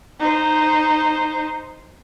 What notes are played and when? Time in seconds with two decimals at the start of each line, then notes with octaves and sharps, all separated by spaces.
0.20 D#4 C5